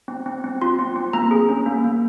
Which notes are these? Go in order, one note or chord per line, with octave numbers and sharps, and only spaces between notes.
C4
C4
C4
F4 C6
C4
C4
A#3 A#5
G#4
C#4
A#3
A#3